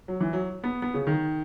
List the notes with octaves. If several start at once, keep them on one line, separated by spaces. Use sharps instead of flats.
F#3
E3
F#3
B3
B3
C#3
D#3